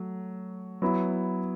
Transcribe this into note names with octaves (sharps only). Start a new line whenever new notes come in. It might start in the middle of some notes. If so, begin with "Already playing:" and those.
Already playing: F#3 A3
F#3 B3 E4